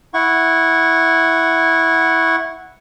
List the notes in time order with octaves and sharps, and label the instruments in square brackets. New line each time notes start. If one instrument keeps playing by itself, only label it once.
[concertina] E4 F#5 C#6